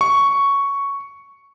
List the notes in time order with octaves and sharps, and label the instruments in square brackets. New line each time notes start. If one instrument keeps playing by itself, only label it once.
[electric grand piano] C#6